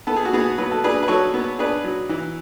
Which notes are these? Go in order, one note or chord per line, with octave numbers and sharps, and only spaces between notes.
B3 A4
G#4
F#4
B3 G#4
F#3 B4
A4
D4 G#4 B4
B4
F#3 A4 C#5
B3
D4 G#4 B4
F#3
E3